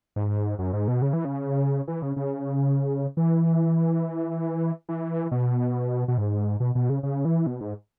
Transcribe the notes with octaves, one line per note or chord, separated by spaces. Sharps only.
G#2
F#2
G#2
B2
C#3
E3
C#3
E3
C#3
C#3
E3
E3
B2
B2
G#2
B2
B2
C#3
C#3
E3
B2
G#2